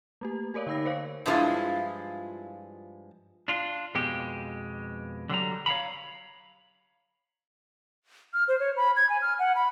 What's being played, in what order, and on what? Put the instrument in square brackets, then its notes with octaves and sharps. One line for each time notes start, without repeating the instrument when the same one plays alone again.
[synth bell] A3 A#3 G4
G4 A#4 C#5 D5 F5
D3 D#4 G5 B5 E6 A#6
A#4 C5 C#5 F5
[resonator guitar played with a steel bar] G2 F3 G#3 B3 E4 F4
[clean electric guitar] D4 F4
F2 B2 G#3 G4
D3 F#3 G3 A#5
C#5 F5 F#5 A#5 B5
[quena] F6
C5
C#5
B5
G#6
G#5
F6
F#5
B5